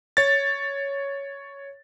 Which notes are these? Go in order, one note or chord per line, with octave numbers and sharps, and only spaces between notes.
C#5 A6